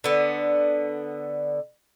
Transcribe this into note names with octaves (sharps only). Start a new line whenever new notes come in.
D3 B3